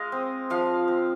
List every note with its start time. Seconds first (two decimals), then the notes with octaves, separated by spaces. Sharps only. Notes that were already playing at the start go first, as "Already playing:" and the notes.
Already playing: G#3 D#5 F5
0.12 C4
0.50 F3 F5
0.88 C4